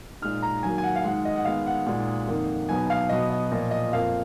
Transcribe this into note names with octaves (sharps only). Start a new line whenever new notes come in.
A#2 G#3 D#4 F6
A#5
D#3 F#3 A#3 G#5
G#5
F#5
F5
G#2 D#3 G#3 F#5
D#5
F#5
D#3 G#3 B3 D#4 F5
F#5
A#2 G#3 D#4
F2 D#3 A#3 D#4
B2 F#3 B3 D#4 G#5
F5
B2 F#3 B3 D#5
D#5
A#2 F3 A#3 D#5
D#5
F2 F3 A#3 F5